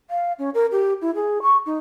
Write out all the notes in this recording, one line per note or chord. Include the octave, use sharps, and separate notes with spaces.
F5
C#4
A#4
G4
E4
G#4
C#6
D#4